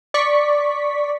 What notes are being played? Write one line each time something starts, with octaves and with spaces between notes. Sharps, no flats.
D5 C#6 B6